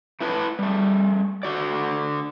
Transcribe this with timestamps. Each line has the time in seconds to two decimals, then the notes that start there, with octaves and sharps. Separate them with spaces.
0.21 A3 E4 B4 A5
0.59 G3 A3
1.43 D3 F#4 D5